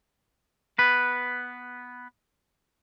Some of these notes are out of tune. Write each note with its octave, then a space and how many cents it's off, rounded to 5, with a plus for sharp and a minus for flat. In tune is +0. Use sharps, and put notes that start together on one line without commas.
B3 +0 B4 +0